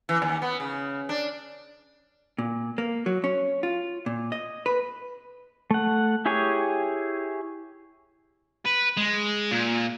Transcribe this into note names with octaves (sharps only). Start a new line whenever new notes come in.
E3
D#2
B3
C#3
D4
A#2
A#3
F#3
C#4
F4
A#2
D#5
B4
A3 F#5
E4 G4 G#4 C#5 G#5
B4
G#3
A#2